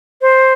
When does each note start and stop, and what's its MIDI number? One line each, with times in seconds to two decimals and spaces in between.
0.21 0.53 72